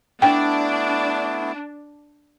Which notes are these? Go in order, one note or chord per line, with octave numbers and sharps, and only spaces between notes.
A3 B3 D4 E4 G5